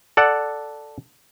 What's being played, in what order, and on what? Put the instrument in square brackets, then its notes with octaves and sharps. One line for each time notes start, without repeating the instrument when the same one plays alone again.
[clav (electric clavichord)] A4 D5 F#5